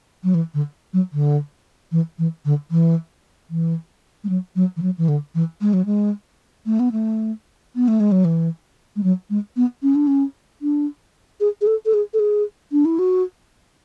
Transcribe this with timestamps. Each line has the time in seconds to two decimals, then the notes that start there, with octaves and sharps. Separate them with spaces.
0.24 F#3
0.34 E3
0.54 D3
0.93 F#3
1.13 D3
1.92 E3
2.19 E3
2.45 D3
2.71 E3
3.50 E3
4.24 G#3
4.29 F#3
4.56 F#3
4.77 E3
4.82 F#3
4.98 E3
5.08 D3
5.35 E3
5.61 G#3
5.73 F#3
5.85 G#3
6.66 A3
6.80 B3
6.92 A3
7.76 B3
7.88 A3
8.00 G#3
8.12 F#3
8.25 E3
8.96 G#3
9.03 F#3
9.30 G#3
9.56 B3
9.83 C#4
9.95 D4
10.07 C#4
10.62 D4
11.40 G#4
11.61 G#4
11.67 A4
11.85 A4
11.94 G#4
12.14 A4
12.19 G#4
12.72 D4
12.85 E4
12.99 F#4